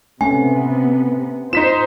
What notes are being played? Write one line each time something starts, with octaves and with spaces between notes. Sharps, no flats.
C3 A3 B3 C#4 G#5
D#4 F4 C5 B6 E7